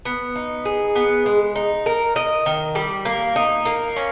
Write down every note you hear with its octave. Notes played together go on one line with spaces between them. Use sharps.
B3
D#4
G#4
B3
G#3
D#4
A#4
D#5
D#3
G3
A#3
D#4
A#3
C#4